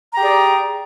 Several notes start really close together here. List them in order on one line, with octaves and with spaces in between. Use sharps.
A#5 G4 G#4 D5